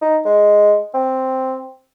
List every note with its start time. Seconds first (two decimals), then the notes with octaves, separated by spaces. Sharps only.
0.02 D#4
0.26 G#3
0.94 C4